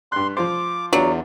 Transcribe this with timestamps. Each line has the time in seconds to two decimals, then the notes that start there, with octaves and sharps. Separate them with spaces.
0.12 G2 C6 F#6
0.37 F3 F4 C5 D6
0.93 E2 F#3 D4 F4